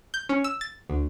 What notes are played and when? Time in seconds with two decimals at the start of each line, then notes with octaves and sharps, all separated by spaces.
0.14 G6
0.29 C#4
0.44 E6
0.61 A6
0.90 D2